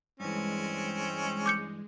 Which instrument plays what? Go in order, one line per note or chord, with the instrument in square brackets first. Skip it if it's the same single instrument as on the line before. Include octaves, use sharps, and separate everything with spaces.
[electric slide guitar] G2 E3 [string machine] G#3 [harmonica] C4 C#4
[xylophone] D6 G6 C#7